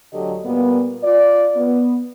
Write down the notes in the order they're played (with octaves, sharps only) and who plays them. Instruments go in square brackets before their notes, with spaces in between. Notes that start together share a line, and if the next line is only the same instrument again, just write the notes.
[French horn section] D2 D3 F#3 G4 A4 D#5
A#2 G3 A#3 B3
F4 D5
B3